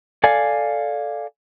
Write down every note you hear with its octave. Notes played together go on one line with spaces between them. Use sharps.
A4 D5 F5 G#5